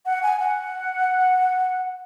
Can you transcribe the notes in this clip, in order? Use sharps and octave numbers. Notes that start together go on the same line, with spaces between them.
F#5
G#5
F#5